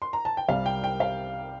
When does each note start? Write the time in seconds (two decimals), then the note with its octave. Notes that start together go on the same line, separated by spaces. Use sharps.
0.02 C6
0.13 A#5
0.25 A5
0.37 G5
0.48 C2 C3 G3 F5
0.66 G5
0.84 G5
1.00 F5